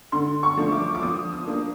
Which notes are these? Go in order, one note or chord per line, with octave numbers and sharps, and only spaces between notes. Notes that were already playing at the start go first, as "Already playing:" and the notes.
D3 C6
C#6
F3 A3 D4
D6
D6
F3 D#6
D#6
A#3 D4